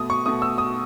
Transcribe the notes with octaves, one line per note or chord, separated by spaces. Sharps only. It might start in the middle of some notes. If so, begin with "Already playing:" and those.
Already playing: B2 A3 D#6
C#6
B2 A3 D#6
E6
D#6